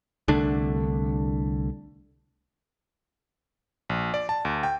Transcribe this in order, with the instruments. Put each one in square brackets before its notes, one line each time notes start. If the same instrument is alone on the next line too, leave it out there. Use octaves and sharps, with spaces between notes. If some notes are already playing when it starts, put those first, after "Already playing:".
[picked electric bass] C2 D3 A3 D4
[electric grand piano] A#1
D5
A5
D2
G5